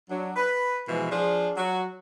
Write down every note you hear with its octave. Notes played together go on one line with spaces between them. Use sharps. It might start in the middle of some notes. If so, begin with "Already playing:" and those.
F#3 D4
B4
B2 E3 F3 G#3
F3 D4 F4 G#4
F#3 F#4